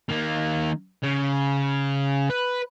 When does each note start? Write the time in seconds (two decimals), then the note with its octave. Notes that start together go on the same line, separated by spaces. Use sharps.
0.09 D#3 A#3
1.03 C#3
2.30 B4